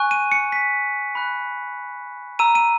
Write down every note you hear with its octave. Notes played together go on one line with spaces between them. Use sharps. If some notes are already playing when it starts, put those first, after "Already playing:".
Already playing: G#5 C#6 F#6
D#7
C#7
B6
B5 F#6
A#5 E6 D#7
D#7